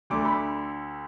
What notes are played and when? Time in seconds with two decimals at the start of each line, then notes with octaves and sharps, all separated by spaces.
0.10 D2 D3 A3 D6
0.25 B5